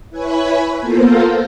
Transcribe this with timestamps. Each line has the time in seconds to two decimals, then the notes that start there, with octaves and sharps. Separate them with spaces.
0.10 E4 B4 C#5 G#5 B5
0.81 A#3 B3 F4 A4 A#4 C5